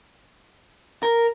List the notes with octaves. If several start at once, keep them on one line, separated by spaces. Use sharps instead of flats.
A#4